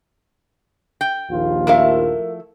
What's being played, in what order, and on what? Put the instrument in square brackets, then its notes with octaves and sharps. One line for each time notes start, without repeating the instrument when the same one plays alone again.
[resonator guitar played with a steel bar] G5
[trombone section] A#1 D#2 F4
[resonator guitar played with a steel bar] F3 A3 E4 [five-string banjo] A#4 F5